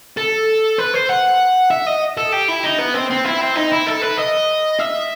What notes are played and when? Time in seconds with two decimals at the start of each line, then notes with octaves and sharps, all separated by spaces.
0.17 A4
0.78 B4
0.94 C5
1.09 F#5
1.70 E5
1.87 D#5
2.17 A4
2.32 G4
2.48 E4
2.64 D#4
2.79 B3
2.94 C4
3.10 C4
3.25 E4
3.41 C4
3.56 D#4
3.72 E4
3.87 A4
4.02 B4
4.18 D#5
4.80 E5